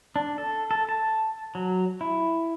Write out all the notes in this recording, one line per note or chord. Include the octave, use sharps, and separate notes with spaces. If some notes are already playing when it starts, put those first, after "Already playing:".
D4
A4
A4
A5
F#3
E4